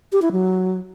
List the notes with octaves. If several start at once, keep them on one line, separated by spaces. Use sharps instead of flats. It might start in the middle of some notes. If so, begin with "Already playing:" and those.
G4
E4
F#3